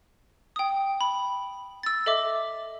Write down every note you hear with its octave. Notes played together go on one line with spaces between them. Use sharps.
G5 D#6
B5
E6 A6
A4 D#5 E5 D6